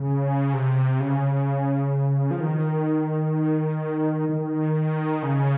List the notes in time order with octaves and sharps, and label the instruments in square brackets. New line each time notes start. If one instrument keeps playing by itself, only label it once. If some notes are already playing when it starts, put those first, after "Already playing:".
Already playing: [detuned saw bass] C#3
C3
C#3
F3
D#3
D#3
C#3